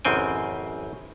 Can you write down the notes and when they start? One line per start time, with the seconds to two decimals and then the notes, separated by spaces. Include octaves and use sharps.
0.05 A1 F#2 C#3 C4 G5 G#5